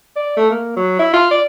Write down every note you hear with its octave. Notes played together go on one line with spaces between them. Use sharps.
D5
A3
A#3
F#3
E4
F4
D5